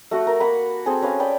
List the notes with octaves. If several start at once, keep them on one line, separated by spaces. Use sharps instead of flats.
A3 F#4 F#5
A#4
A#3 F#5 B5
C4 G#4 A4 G#5
C#4 B4 F5
D5 G5 B5